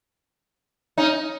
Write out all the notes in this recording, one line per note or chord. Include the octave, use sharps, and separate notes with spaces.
C#4 D#4